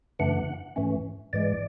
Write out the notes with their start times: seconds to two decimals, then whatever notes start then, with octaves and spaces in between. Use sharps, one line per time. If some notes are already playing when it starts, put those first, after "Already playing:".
0.19 F#2 C#3 E3 A3 D4 F#5
0.76 G#2 E3 A3 C#4
1.33 G#2 E3 G#3 D5